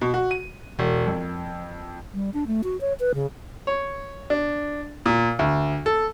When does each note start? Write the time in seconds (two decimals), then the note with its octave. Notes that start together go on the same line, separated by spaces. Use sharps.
0.01 B2
0.14 F#4
0.31 D#7
0.79 E1
1.06 F2
2.14 G3
2.34 D4
2.47 A3
2.64 F#4
2.81 C#5
3.00 B4
3.15 C#3
3.67 C#5
4.30 D4
5.06 A#2
5.39 D2
5.86 A4